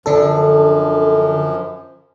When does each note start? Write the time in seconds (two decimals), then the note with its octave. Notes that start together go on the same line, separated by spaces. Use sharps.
0.06 F#2 D3 F3 D4 A4